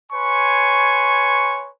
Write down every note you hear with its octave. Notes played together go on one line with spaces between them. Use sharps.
B4 C#5 G#5 C6 C#6